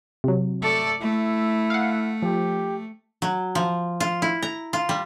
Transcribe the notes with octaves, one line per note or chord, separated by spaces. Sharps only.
C3 F#3
A3 A4 D5
A3 E4
F5 F#5
F3 G4
F#3
F3
F4
E4
A#5
F4
G3